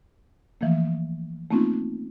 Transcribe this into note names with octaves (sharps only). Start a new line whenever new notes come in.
E3 F3 A3 A#3
A3 A#3 C4 C#4 D#4 F4